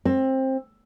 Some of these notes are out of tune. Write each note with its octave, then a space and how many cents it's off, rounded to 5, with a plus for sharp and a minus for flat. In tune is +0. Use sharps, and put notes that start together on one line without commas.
C4 +20